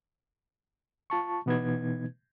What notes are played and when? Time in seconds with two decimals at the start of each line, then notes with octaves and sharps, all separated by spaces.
1.10 F4 A5 C#6
1.46 B2 E3 B3 D#4 B4 G#6